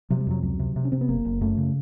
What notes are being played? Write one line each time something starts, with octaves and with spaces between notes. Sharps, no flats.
C3 F#3
G3
F2 F#3
C#2 F#3
C3
C3
C#4
C3 C4
B3
F#1 A#3
F#1
F#2 A3
C#3